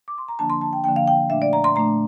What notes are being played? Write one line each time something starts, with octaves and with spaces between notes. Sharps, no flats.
D6
C6
A#5
D3 F3 A#3 D4 A5
C6
A5
G5
D3 F3 A#3 D4 G5
F5
G5
A#2 A3 D4 E5
D5
A#5
C6
A#2 A3 D4 A#5